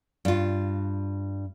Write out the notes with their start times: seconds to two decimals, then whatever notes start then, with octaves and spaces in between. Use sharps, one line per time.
0.25 G2 F4